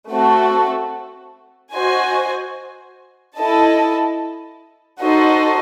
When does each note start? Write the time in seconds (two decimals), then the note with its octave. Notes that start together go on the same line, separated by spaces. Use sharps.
0.11 A3 C4 F#4 A4
1.74 F#4 C5 D#5 G#5
3.38 E4 A4 D#5 A5
5.02 D#4 F#4 A4 C5 D#5